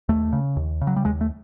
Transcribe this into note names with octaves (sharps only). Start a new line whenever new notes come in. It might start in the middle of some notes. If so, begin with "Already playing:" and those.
D#2 A3
C#3
D#2
C#3
F#3
G3
D#2 G#3
A3